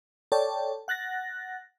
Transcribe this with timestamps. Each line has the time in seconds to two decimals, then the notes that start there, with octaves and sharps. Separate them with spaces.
0.32 A4 C#5 D5 G5 A5
0.88 F#5 F#6 A6 A#6